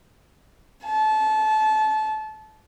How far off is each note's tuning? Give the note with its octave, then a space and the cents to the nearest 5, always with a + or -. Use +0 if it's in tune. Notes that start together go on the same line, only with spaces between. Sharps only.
A5 -25